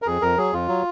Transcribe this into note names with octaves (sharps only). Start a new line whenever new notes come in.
A#4
F2 G#4
F2 A#4
F#3 G#4
F2 F4
F#3